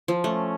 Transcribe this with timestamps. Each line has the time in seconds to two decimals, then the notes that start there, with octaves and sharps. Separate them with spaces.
0.08 F3
0.24 A3 C#4